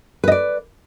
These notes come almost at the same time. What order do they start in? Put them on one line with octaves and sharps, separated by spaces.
B4 D#5 D5